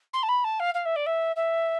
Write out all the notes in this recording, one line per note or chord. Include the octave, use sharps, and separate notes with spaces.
C6
A5
B5
A5
F5
F5
E5
D5
E5
E5